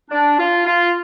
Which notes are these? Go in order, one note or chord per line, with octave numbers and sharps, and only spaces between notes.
D4
F4
F4